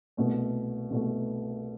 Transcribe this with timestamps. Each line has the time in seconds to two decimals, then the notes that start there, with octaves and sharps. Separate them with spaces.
0.17 C2 B2 A3
0.90 C2 B2 A3